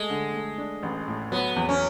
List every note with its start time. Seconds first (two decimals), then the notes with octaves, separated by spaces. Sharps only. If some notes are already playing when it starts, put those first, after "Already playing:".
Already playing: G#3 A3
0.10 D3
0.33 A3
0.58 D4
0.83 A1
1.08 A2
1.32 F#3 B3
1.56 E2
1.69 C#4